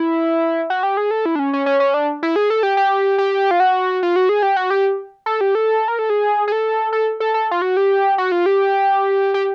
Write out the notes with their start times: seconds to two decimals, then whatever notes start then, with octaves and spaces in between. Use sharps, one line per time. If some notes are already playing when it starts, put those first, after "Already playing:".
Already playing: E4
0.70 F#4
0.83 G4
0.97 G#4
1.11 A4
1.26 E4
1.35 D4
1.39 C#4
1.53 C#4
1.66 C#4
1.80 C#4
1.94 D4
2.23 E4
2.36 G#4
2.50 A4
2.63 G4
2.77 G4
3.18 G4
3.51 F4
3.60 F#4
4.03 F4
4.16 F#4
4.29 G#4
4.43 G4
4.56 F#4
4.70 G4
5.26 A4
5.41 G4
5.55 A4
5.88 A#4
5.99 A4
6.10 G#4
6.48 G#4
6.52 A4
6.93 A4
7.20 A4
7.34 A4
7.51 F4
7.62 F#4
7.77 G4
8.18 F#4
8.32 F4
8.46 G4
9.34 G4